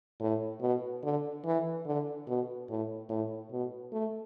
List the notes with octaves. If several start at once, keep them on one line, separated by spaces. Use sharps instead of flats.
A2
B2
D3
E3
D3
B2
A2
A2
B2
A3